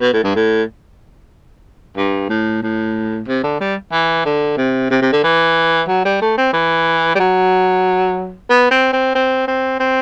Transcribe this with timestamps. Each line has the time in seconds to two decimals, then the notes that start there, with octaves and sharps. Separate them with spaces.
0.01 B2
0.13 A2
0.24 G2
0.35 A2
1.97 G2
2.29 A2
2.63 A2
3.27 C3
3.43 D3
3.60 G3
3.92 E3
4.25 D3
4.57 C3
4.91 C3
5.02 C3
5.12 D3
5.24 E3
5.88 F#3
6.05 G3
6.22 A3
6.38 C4
6.53 E3
7.15 G3
7.19 F#3
8.50 B3
8.71 C4
8.93 C4
9.15 C4
9.47 C4
9.80 C4